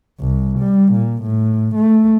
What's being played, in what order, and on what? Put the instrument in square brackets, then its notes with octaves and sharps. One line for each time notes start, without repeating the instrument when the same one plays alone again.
[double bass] C2
G3
A#2
A2
A3